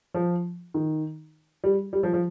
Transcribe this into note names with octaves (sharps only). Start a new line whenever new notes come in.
F3
D#3
G3
G3
F3
F3